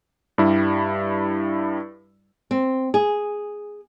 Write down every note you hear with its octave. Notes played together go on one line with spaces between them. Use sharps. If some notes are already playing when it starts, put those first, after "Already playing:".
G2 G3 E4
C4
G#4